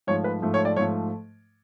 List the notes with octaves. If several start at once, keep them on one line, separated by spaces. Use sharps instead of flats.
G#2 F3 A3 C#5
B4
G#2 F3 A3
C#5
D5
G#2 F3 A3 C#5